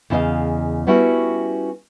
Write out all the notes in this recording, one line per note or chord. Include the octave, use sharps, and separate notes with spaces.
E2 C#3 E4 F#4 D#5 F5
G3 B3 C#4 E4 F#4